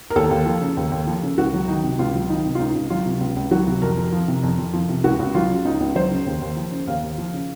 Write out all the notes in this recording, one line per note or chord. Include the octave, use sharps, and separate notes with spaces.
A#4
D#2 A4
D#2
F3
C#3
D#2
D#2
F3
C#3
C#2 F#4
F#3
D#3 D#4
C3
C#2 F4
F#3
D#3 D#4
C3
F4
C#2 D#4
C#2
F#3 F4
C3
C#2
C#2
F#3 F#4
C3
F2 A#4
F2
F3
C3
F2
F2
F3
C3
C#2 F#4
C#2
F#3 F4
C#3
C#2 D#4
C#2
F#3 C5
C#3
D#2
D#2
F3
C#3
D#2 F5
D#2
F3
C#3